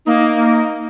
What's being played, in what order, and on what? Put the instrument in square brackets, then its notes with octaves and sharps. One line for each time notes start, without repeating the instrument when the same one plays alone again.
[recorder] A#3 [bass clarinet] D#4